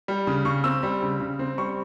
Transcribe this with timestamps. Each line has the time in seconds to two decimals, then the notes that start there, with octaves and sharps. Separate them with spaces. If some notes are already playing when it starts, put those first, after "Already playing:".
0.08 G3
0.27 C#3
0.45 C#3 C#6
0.64 C4 E6
0.83 G3
1.02 C#3
1.20 C#3
1.39 C4
1.58 G3 C#6